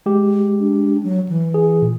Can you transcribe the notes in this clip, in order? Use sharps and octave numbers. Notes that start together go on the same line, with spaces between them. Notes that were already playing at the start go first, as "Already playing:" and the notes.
G#3 G4
D4
F#3
E3
G#4
A#2